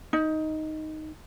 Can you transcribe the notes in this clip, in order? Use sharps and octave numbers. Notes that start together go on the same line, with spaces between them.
D#4